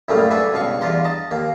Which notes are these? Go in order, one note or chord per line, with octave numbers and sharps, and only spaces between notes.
F#2 A2 C#3 G3 A3 A#3
D4 F#4 B4 E5 G#5
C#2 G2 B2 F5 C#6
E2 G2 F4 G4 A#5 C6
D#5 A5 A#5
D#2 A#3